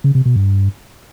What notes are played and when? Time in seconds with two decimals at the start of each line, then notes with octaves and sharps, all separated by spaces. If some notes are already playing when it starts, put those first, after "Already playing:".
0.04 C#3
0.15 C3
0.25 B2
0.36 G2